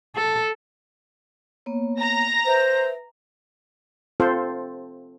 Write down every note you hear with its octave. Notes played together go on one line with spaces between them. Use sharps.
A4
A#3 B3 C#5
A#5 A#6
B4 C5 E5
C4 F4 A4 C5